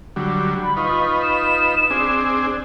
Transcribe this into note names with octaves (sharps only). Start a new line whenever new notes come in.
D3 F#3 G3
B5
D#4 F4 B4 C#6
E7
C4 D4 G#4